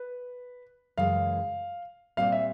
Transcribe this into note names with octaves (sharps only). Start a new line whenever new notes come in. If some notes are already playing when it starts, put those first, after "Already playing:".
Already playing: B4
F#2 C#3 E3 G#3 F5
A#2 G3 C4 F5
E5